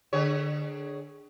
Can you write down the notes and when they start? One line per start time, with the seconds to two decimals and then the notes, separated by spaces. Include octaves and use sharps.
0.13 D3 G#4 C#5